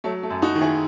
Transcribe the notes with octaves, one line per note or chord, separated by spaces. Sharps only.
F#3 A3
A3
F#2
D#4 F#4
D#3
E4 G#4